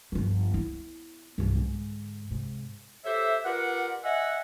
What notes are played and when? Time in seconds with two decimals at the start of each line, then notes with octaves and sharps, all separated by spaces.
0.12 G1 F3
0.51 B3 E4
1.38 C2 G2
1.55 G#2 D3
2.31 G#2 C3
3.05 G4 A4 C5 C#5 E5
3.45 F4 G4 A#4 B4 D5 F#5
4.04 D#5 E5 F#5 G#5